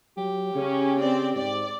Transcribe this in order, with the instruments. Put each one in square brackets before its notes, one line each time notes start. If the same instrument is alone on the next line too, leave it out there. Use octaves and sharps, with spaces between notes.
[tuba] F#3 [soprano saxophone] G4
[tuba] C#3 [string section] C#4
[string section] C4 D5
[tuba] G#2 [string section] D5